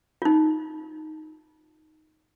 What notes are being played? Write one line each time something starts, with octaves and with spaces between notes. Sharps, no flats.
D#4 F4